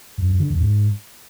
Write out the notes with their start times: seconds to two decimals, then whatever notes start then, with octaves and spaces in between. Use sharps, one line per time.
0.18 F#2
0.28 F#2
0.39 D3
0.50 E2
0.61 G#2